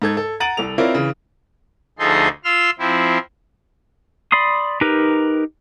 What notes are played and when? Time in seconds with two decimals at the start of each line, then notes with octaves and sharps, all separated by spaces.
0.02 G#2 A4 G#6
0.17 A4
0.40 F#5 A#5 A6 D7 D#7 F#7
0.57 C2 A4 F7
0.78 C4 E4 F4 A#4 C#5 D5
0.95 C#3 E3
1.99 D2 F3 D#4 G#4 A4 C6
2.44 F4 C6 E6 F6
2.79 F3 C4 E4
4.32 D5 B5 C6 D#6
4.81 D#4 G4 A#4 B4